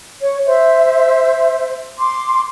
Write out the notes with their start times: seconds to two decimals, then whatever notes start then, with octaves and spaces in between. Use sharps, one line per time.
0.20 C#5
0.46 C5 E5
1.99 C6 D6